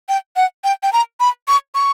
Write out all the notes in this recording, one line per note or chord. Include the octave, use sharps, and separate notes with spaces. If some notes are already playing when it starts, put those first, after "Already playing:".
G5
F#5
G5
G5
A#5
B5
C#6
C#6